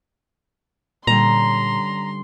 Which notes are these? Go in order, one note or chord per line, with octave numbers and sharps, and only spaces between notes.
A#2 D3 G3 C#4 A#5 C6